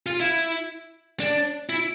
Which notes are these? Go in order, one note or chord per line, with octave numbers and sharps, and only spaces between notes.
F4
E4
D4
E4